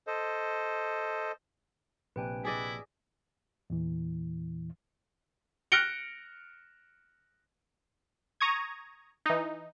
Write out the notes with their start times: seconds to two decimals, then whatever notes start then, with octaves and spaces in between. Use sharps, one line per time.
0.07 A4 C5 D#5
2.16 A#1 C3 D4 B4 G5 G#5
2.45 E4 G#4 D5 D#5
3.70 E2 A#2 E3
5.72 F6 F#6 A#6 C#7 D7 G7
8.41 A#5 C#6 D#6 G#6
9.26 E3 D#4